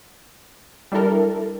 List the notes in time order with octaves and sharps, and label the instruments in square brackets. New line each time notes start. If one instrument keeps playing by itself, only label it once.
[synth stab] G3 D4 E4 A4 A#4